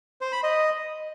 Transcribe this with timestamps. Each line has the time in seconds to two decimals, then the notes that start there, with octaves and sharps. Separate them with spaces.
0.21 C5
0.32 B5
0.43 D#5